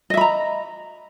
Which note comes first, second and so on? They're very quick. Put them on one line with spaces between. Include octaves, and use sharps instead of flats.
D#5 E5 B5 A#5